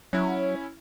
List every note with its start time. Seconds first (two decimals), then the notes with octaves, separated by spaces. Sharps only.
0.13 F#3 C#4 E4